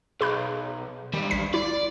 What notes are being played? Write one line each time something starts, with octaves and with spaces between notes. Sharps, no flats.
B1 G#4 B5 F#6
G#2 D#3 G3
A1 B6
E4 D5